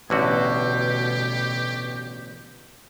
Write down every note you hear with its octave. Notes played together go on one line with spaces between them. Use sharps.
A1 B2 D3 F#4 G4